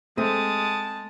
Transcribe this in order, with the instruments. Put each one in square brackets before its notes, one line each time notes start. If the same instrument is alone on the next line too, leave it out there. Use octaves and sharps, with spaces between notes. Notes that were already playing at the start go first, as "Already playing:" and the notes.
[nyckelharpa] G#3 A5 [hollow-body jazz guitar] A3 C4 [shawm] D#6